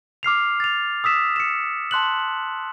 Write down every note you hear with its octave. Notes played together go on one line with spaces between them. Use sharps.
D6 F6 C7 F7
A6 F7
D#6 E6 B6 E7
C#7 E7
A5 C6 F#6 F#7